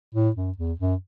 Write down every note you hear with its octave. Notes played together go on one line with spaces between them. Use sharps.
A2
F#2
E2
F#2